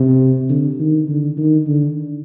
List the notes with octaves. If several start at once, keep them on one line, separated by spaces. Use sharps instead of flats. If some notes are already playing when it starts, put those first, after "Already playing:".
Already playing: C3
D3
D#3
D3
D#3
D3